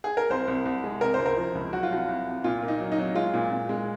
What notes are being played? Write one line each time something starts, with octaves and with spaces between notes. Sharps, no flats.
G#4
A#4
C2 C5
C2
C2
G#3
C3 A#4
C5
C#2
A#4
F3
C#2
F#3 F#4
F4
C2 F#4
C2
C3
A#2 F4
A#3
D#4
F#3
D#4
F#3
G#3 F4
A#2
A#2
G#3